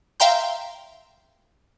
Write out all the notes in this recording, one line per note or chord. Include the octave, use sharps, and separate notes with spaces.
E5 F5 G5 A#5 C6 G6